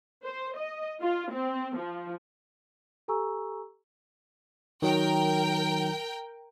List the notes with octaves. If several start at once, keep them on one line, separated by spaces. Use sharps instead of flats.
C5
D#5
F4
C4
F3
G4 A4 G#5 A#5 C#6 E6
D#3 F#3 A#4 G5